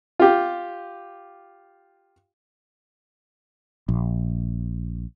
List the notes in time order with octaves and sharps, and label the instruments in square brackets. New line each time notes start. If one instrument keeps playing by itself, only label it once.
[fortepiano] F4 G4
[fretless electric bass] A#1